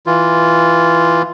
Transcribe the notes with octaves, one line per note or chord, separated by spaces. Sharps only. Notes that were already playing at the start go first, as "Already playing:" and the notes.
E3 F4